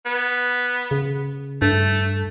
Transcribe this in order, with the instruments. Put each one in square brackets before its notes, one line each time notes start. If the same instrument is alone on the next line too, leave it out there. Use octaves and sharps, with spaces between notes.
[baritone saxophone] B3
[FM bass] C#3
[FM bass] G2 [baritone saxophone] A3